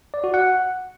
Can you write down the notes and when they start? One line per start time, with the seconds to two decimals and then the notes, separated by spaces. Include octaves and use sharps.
0.14 D5
0.24 F#4
0.34 F#5